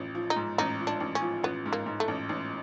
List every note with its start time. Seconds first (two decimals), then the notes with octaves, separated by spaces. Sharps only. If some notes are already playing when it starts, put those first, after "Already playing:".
Already playing: A1 F3
0.15 F3
0.30 D#4
0.36 G#2
0.58 A1 D#4
0.80 F3
0.87 D4
1.00 A1
1.15 C#4
1.22 F3
1.43 A1 B3
1.66 G#2
1.73 A#3
1.86 G#2
2.00 A3
2.08 A1
2.29 A1